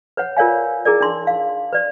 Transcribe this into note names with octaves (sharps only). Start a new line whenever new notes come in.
B4 C#5 F#5
F4 A#4 C#5 D5 F5 G#5
E4 G#4 A#4 D5
D4 D#4 C6
F5
B4 D5